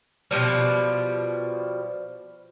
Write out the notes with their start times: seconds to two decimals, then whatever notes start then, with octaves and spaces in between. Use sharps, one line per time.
0.31 B2 E3 F3 G3